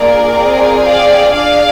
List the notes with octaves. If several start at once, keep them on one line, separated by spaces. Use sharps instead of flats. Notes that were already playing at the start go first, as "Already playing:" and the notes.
Already playing: A#3 D4 F4 G#4 A#4 D5
C4 F4 G#4
D5 F5
D4 G#4 D5 F5